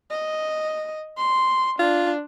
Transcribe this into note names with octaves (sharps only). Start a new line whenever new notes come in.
D#5
C6
D4 F4